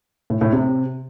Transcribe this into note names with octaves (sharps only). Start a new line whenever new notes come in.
A2
A2
C3